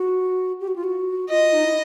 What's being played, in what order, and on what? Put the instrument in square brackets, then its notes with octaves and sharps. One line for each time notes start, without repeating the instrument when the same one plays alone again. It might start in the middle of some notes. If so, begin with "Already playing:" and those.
Already playing: [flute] F#4
G4
F#4
F4
F#4
[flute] F4 [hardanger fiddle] D#5
[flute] D#4
E4